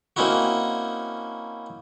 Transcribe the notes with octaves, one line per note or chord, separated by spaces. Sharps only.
A#3 C4 C#4 D#4 E4 F#4